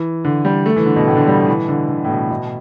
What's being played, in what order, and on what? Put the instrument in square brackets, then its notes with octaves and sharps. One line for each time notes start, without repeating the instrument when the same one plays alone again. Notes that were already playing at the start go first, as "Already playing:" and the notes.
Already playing: [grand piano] E3
D3
G3
A3
E3
D3
B2
A2
D3
G3
E3
D3
D3
A2
B2
B2